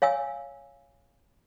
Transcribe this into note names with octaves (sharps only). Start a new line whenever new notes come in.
C#5 F5 G#5 E6